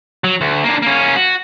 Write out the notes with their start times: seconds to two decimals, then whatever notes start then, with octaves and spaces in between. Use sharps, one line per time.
0.24 F#3
0.41 D2
0.64 D3 A#3
0.82 A#3 C#4
1.16 F#4